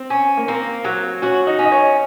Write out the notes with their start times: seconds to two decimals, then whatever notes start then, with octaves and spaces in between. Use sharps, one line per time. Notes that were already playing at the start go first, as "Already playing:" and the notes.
Already playing: C4
0.10 C#4
0.37 A#3
0.48 A#3 C4
0.85 F#3
1.22 C#4 F#4
1.47 D#4
1.59 C#4
1.65 D#5
1.72 C#5